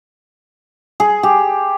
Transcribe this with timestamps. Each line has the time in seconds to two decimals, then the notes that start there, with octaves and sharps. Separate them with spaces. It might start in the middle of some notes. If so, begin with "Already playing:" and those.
1.00 G#4
1.23 G4